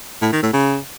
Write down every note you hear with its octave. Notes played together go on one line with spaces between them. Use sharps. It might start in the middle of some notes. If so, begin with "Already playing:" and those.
A2
D#3
A2
C#3